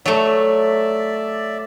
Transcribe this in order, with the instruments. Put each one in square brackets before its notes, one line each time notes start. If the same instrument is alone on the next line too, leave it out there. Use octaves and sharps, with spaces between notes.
[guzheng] F#3 A3 [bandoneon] D5 E5